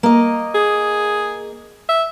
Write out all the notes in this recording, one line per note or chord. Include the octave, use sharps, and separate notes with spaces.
A#3 D#5
G#4
E5